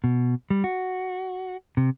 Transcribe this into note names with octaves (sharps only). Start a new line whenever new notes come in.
B2
G3
F#4
C3